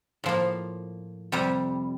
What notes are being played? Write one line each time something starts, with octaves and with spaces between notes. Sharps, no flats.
A2 F3 A#3
F2 C3 G3